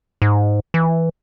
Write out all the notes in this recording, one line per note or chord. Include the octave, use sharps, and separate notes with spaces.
G#2
E3